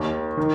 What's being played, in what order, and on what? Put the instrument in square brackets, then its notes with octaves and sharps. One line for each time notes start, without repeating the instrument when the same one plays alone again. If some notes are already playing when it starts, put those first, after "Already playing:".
Already playing: [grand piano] D#2 D#3
D#3